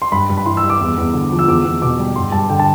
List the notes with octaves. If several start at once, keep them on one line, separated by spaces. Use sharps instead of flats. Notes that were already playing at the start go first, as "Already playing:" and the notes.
C6
G2 B5
G2
B5
E3 C6
E6
G3
D6
E2
E2
D3
F3
E6
E2 D6
E2
B2 D6
G3
G2 C6
G2 A5
D3 G5
A5